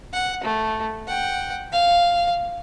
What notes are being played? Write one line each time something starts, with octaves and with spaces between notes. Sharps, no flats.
F#5
A3
F#5 G5
F5